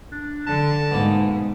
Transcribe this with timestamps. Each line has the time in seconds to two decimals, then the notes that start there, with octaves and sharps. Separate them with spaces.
0.12 D4
0.47 D3 A5
0.91 G#2 B2 A#3